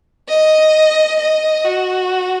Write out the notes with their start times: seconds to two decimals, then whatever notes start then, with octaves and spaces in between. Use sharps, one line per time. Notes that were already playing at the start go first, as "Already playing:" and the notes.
0.29 D#5
1.19 D#5
1.64 F#4